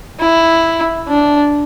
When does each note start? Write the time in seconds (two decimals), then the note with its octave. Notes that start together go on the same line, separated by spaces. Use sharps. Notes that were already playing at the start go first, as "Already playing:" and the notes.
0.20 E4
1.08 D4